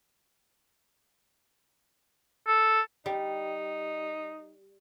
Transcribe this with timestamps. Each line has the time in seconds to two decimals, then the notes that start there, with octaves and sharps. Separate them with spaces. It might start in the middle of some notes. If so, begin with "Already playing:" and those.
2.47 A4
3.06 G3 D#4